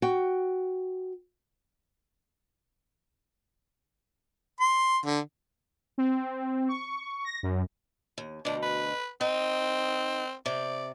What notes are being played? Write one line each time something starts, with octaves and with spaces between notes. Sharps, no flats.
F#4 G5
C6
D3
C4
C#6
A#6
F#2
D#2
D2 B2 D4
B4
C4 D#4
C3 D5